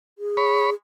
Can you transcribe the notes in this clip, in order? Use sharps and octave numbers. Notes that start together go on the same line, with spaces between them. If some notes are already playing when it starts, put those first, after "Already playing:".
G#4
C#5 B5